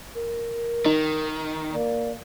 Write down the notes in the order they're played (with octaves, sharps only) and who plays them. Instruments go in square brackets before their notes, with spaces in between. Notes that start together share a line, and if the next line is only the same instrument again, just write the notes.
[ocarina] A#4
[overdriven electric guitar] D#3 [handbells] D#4 D#5
[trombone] A#3 [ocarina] D5